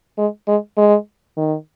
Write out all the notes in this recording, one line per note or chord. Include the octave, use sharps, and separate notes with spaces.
G#3
G#3
G#3
D#3